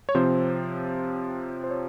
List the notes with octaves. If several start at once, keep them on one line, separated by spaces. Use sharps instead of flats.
C#5
C3 F3 C4 C5
C5
C#5